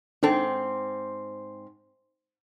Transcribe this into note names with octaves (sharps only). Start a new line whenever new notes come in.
G#2 C4 D4 A4